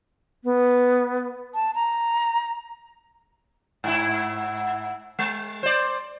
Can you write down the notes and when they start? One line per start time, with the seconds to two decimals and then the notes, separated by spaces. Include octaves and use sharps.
0.44 B3
1.55 A5
1.75 A#5
3.84 G#2 E4
5.19 G#3
5.63 C5 D5